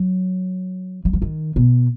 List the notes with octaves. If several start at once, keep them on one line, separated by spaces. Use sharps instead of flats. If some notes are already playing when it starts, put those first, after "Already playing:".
Already playing: F#3
F#3
F3
D#3
B2